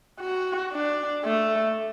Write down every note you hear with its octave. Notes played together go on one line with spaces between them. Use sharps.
F#4
D4
A3